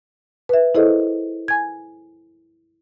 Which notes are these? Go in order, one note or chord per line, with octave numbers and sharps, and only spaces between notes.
B4 E5
E4 G#4 A4 C5 D#5
G#5 G#6